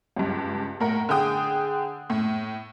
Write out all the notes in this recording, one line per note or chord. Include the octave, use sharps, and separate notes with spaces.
C#2 G2
A2 A#4 F#5
D3 G#4 G5 D#6
A2